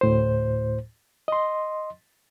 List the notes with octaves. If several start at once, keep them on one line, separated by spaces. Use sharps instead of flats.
D2 A2 C5
D#5 C6